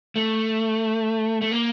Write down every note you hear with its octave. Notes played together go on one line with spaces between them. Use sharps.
A3
A3
A#3